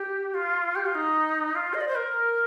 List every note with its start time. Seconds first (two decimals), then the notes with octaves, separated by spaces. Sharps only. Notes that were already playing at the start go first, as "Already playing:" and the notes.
Already playing: G4
0.34 F4
0.75 G4
0.85 F4
0.94 D#4
1.55 F4
1.73 D#5
1.80 D5
1.87 C5
1.95 A#4